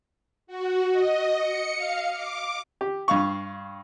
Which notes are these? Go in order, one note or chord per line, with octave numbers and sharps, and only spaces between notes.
F#4
D#5
C#7
F5
D6
G4
G2 F5 C#6